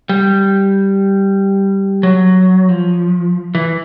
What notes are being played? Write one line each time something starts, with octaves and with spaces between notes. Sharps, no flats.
G3
F#3
F3
E3